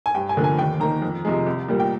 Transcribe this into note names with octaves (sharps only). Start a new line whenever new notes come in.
G#5
G2 G5
G#5
D3 F3 A#3
G#5
D#2 G5
D#3 A#3 A#5
F2
C3 F3 G#3
C2
A#2 G3 A#3
G5